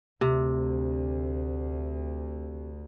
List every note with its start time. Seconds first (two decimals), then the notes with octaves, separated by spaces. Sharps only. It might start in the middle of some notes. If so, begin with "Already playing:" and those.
0.21 D2 C3